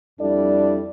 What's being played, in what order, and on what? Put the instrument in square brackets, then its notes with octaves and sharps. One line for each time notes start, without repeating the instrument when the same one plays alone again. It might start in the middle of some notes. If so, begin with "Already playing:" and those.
[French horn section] F2 G3 D4 E4 A4 D5